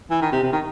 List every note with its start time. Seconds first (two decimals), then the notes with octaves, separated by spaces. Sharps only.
0.10 E3
0.21 D#3
0.32 C3
0.43 C3
0.52 D#3